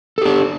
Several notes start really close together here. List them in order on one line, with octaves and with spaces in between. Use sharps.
A4 G4 D4